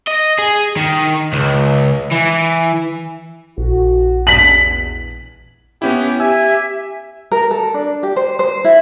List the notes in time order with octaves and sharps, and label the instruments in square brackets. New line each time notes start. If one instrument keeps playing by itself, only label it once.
[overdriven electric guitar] D#5
G#4
D#3
C#2
E3
[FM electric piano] A#1 [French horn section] F#4
[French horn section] E2 [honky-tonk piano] B6 F#7
[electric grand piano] B3 C#4 E4 [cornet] G4
[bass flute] G4 [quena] E5 [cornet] G#5 [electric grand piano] E6
[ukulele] A#4
A4
D4
G4
C5
C5
E4